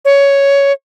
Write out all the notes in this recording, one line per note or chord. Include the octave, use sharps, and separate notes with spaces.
C#5